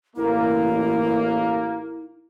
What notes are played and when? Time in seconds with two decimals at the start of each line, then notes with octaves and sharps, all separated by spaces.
0.16 A1 A#3 E4